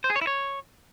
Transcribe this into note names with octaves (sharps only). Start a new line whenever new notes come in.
C5
G#4
C#5
E4
C#5